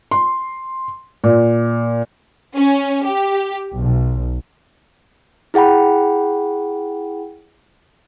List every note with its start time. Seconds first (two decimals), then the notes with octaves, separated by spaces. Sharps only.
0.11 C6
1.24 A#2
2.56 C#4
3.05 G4
3.79 B1
5.54 E4 G#4 F#5 G5 B5